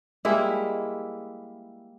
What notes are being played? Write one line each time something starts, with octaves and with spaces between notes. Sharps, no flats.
G3 G#3 A#3 E4